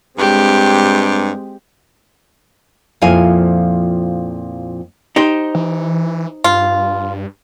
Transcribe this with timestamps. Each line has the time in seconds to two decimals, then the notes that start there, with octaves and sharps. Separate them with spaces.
0.19 G2 G#3 C4 G4
3.01 F2 A#2 F3 E4 F5 G#5
5.16 D#4 G4 C5
5.55 E3
6.44 G2 F4